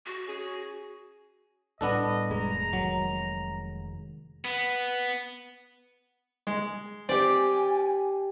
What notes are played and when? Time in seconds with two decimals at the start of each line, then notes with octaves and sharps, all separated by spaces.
0.06 F#4
0.28 C#4 G#4
1.81 A2 G3 B3 D4 A4 D#5
2.30 F1 G#3 A#5
2.73 D#3 F#3
4.45 B3
6.47 G#3
7.09 C4 G4 D5 G#5